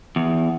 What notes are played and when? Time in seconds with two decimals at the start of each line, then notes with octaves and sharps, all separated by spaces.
0.16 E2